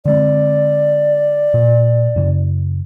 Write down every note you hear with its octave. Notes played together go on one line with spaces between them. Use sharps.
D3 G#3 C4 D5
A#2
F#2 C#3